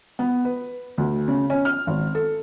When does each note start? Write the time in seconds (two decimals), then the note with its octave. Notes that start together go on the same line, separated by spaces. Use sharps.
0.19 B3
0.45 B4
0.98 D2
1.28 C#3
1.50 C#4
1.65 F6
1.87 G#1
2.15 A4